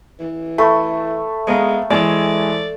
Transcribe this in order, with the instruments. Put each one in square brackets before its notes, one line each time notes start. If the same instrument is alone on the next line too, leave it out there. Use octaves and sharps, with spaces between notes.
[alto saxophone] E3
[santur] A3 [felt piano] B5
[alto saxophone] G#3 [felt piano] B3 F5 A#5
[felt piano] E3 G#3 [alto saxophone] D5 [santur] E6